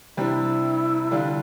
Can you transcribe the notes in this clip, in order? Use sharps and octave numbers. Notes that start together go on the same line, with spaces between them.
C3 G3 D4 E4
D3 G3 D4 F4